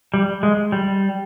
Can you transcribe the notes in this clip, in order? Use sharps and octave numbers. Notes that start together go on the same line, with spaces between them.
G3
G#3
G3